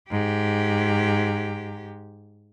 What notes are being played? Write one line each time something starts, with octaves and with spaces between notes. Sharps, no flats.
G#2 G4